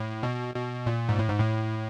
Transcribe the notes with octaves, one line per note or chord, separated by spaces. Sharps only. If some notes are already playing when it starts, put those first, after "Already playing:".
Already playing: A2
B2
B2
A#2
G#2
A2
G#2
A2